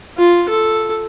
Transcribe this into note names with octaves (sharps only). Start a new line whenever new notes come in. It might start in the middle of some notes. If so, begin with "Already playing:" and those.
F4
A4